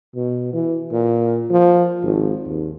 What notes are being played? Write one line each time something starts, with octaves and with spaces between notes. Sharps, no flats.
B2
E3
A#2
F3
G#1
D#2